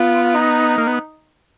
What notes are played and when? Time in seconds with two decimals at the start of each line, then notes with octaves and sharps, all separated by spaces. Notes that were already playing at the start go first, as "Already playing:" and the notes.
Already playing: B3 F4
0.35 D#4
0.78 A#3
0.87 B3